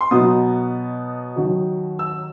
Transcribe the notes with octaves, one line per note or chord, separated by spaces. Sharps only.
C6
B2 F#3 B3 D#4 D#6
D#2 D#3 F#3
E6